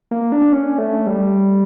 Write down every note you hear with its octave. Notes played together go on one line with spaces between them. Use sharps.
A#3
D4
C#4
A3
G3